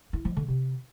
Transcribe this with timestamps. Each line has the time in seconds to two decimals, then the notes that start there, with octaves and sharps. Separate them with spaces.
0.13 E4
0.25 F3
0.37 D3
0.48 C3